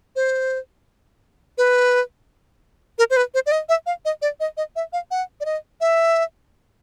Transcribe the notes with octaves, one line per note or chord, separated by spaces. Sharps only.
C5
B4
A#4
C5
B4
C5
D5
D#5
E5
F5
D#5
D5
D#5
D#5
E5
F5
F#5
D5
D#5
E5